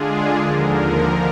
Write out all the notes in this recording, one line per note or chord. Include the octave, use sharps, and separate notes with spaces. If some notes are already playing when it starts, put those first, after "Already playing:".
Already playing: D3 G#3 D4 F4 G#4
D#2 D3 F3 A#4